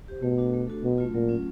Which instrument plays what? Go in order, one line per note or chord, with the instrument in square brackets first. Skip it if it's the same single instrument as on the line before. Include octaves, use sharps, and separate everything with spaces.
[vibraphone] G4 C5
[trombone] B2 [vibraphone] A3
[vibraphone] D4 F#4 A4
A3
D4 F#4 A4
[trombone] B2 [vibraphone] F#3
[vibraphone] A3 C#4 F4
[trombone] A#2 [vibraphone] F#3
[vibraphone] A3 C#4 F4